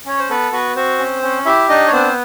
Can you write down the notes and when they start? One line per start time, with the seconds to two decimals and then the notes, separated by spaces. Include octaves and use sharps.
0.06 C#4 C#5
0.19 C5
0.30 B3 A4 B4
0.52 B3 F#4 B4
0.76 C4 F#4 C5
0.99 C#4
1.22 C#4
1.45 E4 G4 E5
1.69 D4 D#4 D#5
1.87 C#5
1.92 B3 C4 C5